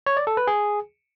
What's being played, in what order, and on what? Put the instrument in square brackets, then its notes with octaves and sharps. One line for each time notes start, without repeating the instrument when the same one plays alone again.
[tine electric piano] C#5
D5
A4
B4
G#4